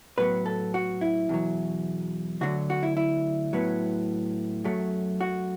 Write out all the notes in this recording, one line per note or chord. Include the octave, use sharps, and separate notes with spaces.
A2 F#3 B3 B4
A4
F#4
E4
E2 B2 F#3
D2 D3 F#3 F#4
F#4
E4
E4
A2 F#3 B3
F#2 F#3 A3
F#4